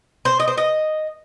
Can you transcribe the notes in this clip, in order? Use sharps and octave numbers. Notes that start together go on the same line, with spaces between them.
C5
D#5
C5
D#5